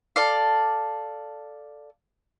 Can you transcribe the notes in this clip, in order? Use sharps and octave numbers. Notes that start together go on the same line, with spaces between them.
A4 D5 F5